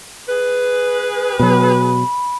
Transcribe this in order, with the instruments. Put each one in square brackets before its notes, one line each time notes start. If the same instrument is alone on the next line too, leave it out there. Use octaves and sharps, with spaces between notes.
[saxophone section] G#4 B4
[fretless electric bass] B2 F#3 [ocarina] B5